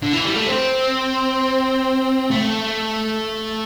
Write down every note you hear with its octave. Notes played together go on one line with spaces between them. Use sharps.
D3
E3
G3
A3
C4
A3